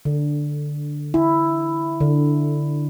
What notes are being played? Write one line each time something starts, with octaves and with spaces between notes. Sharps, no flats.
D3
E4
D3